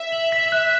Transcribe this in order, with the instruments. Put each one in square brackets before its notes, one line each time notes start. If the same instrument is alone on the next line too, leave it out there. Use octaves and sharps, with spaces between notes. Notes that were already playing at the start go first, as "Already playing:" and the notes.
Already playing: [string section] E5
[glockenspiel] F#7
B6
F#6